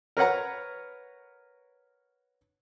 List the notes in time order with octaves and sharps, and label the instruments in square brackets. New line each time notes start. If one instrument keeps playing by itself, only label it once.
[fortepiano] A#4 B4 C#5 F#5 A#5